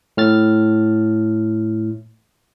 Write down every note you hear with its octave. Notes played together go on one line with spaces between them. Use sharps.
A2 F6 A6